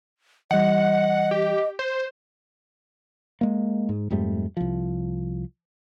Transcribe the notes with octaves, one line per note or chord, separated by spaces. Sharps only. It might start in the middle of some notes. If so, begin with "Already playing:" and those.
E3 G3 D#5 F#5
G4
C5
G#3 A#3
G#2
F2 G#2 G3 A3
C2 F3